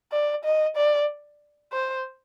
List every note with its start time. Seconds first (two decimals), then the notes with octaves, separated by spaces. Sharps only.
0.12 D5
0.44 D#5
0.76 D5
1.72 C5